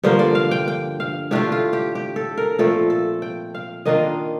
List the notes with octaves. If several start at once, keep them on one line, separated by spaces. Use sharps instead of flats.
G2 D3 F3 A#3 C5
D5
F5
G5
G5
F5
A2 A3 D4 F4 G4
F4
G4
G4
A4
A#4
A#2 F3 A3 C4 A4
A4
G5
F5
D#3 A#3 D4 F4 D#5